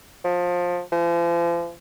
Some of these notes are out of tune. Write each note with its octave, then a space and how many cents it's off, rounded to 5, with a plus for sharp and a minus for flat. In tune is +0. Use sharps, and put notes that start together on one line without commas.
F3 +20
F3 -40